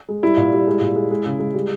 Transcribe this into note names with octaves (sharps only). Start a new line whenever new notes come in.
G#3
G3 E4
A#2
G3
G#3
A#2
G#3
G#3
C#3
G#3
G3